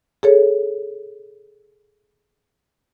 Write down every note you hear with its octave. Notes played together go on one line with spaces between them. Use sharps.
G#4 A4 C#5